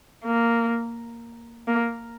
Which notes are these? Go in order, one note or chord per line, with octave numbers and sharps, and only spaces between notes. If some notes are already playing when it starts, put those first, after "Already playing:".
A#3
A#3